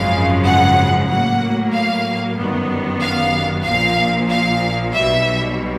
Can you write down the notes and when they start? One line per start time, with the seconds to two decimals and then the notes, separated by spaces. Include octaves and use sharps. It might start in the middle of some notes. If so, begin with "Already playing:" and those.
Already playing: G#1 F#2 C#3 F3 G#3 F5
0.45 F#5
1.09 A2 F#3 A#3 F#5
1.73 F5
2.37 G1 F#2 D#3 G3 B3
3.01 F5
3.65 A#1 A#2 F3 F5
4.29 F5
4.93 B1 B2 G3 E5